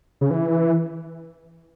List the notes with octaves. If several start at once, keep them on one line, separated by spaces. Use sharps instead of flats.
C#3
E3